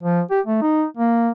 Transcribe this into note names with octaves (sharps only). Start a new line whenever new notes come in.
F3
G4
A3
D#4
A#3